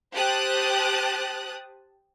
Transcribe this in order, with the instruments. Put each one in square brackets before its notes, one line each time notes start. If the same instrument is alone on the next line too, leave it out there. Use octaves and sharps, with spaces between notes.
[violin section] G4 C5 A5 D#6 F#6